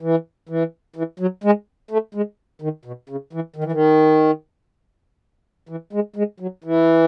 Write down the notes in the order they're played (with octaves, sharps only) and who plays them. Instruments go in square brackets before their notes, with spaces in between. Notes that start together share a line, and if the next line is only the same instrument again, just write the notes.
[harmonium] E3
E3
E3
F#3
G#3
A3
G#3
D#3
B2
C#3
E3
D#3
E3
D#3
E3
G#3
G#3
F#3
E3